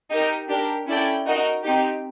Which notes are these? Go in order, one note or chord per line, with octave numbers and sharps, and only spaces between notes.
D#4 G4 A#4 D#5
D4 G4 A#4
C#4 E4 A4 D5 G5
D#4 F#4 A#4 D#5
C4 D#4 G4